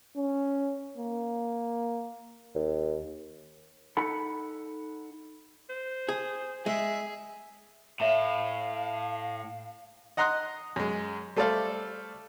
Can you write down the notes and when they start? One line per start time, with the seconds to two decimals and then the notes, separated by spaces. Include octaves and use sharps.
0.17 C#4
0.97 A#3
2.55 D#2
3.97 D#4 A4 F#5 B5
5.70 C5
6.09 G#4
6.66 G#3 G#4 E5
8.00 A2 C#5 E5 F5 A5
10.17 D#5 F#5 A#5 C6 D#6 F#6
10.76 F#2 G#3
11.36 G3 A3 A4 C5 D5 F5